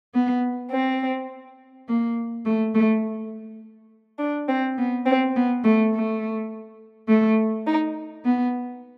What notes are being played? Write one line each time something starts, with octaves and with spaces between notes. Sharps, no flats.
B3
C4
A#3
A3
A3
D4
C4
B3
C4
B3
A3
A3
A3
D#4
B3